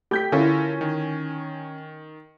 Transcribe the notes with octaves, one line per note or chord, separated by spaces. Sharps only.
A3 G4 G5 G6 B6
D3 C#4 E4 F4 A4 A#4
D#3